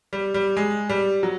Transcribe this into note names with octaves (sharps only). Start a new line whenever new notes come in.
G3
G3
G#3
G3
F#3